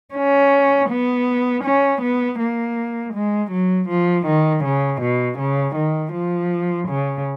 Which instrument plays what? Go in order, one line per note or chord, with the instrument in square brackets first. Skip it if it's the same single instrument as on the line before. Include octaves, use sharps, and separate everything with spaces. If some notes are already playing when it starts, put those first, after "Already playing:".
[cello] C#4
B3
C#4
B3
A#3
G#3
F#3
F3
D#3
C#3
B2
C#3
D#3
F3
C#3